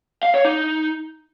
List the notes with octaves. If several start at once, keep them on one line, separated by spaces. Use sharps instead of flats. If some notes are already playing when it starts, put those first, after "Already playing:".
F5
C#5
D#4